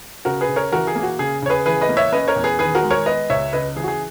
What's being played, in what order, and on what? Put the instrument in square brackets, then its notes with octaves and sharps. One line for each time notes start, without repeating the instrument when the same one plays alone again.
[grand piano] C#3 F#4 A#4
G#4 B4
C#3
A#4 C#5
E3 F#4 A#4
G#4
A#3
F#4
C#3 G#4
C#3 C#5
G#4 B4
E3 G#4 B4
B4 D#5
A#3
C#5 E5
C#4 B4 D#5
A#4 C#5
E2
G#4 B4
D#3 G#4 B4
F#4 A#4
G#3
A#4 C#5
B3 B4 D#5
C#2 C#5 E5
C#3 B4 D#5
E3 G#4
F#4
G#4